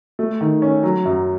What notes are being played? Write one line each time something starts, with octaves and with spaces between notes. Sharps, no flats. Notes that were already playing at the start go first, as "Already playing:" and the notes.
A3
D#3
C#4
F#3
F#2